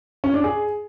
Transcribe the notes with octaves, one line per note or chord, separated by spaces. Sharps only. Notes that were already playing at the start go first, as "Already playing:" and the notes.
C#4
D4
G#4